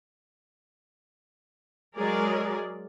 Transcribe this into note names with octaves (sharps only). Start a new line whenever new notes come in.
F#3 G#3 G#4 A#4 D5